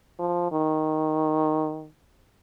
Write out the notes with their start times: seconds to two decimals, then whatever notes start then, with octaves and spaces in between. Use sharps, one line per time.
0.19 F3
0.52 D#3